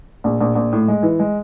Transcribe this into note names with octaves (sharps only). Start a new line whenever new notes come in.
A#1
A#1
A#1
A2
G#3
E3
G#3